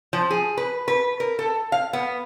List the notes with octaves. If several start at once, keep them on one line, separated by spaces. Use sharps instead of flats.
F3
G#4
B4
B4
A#4
A4
F5
B3